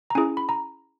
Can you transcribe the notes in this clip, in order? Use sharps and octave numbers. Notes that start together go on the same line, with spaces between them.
A#5
C#4 E4 G#4 G#5
B5
A#5